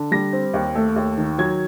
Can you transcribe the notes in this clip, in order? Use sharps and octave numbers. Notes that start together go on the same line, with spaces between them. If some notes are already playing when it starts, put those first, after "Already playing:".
Already playing: D3
G3 A#6
C4
D#2
A3
D#2
D#3
F#3 G#6